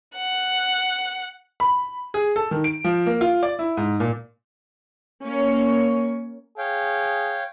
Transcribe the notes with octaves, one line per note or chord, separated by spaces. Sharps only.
F#5
B5
G#4
A4
D#3
D7
F3
A#3
F4
D5
E4
G#2
A#2
A#3 C#4 C#5
G#4 C#5 F5 G5